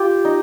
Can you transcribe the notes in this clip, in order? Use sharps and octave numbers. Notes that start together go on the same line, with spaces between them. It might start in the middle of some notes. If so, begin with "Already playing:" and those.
Already playing: F4 G4
D#4